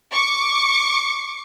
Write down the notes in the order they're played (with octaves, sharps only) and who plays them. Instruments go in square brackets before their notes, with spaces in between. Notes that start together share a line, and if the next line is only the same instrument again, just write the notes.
[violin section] C#6 D6 C#7